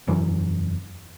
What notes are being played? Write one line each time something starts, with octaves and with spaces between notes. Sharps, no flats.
E1 F#2 E3 F#3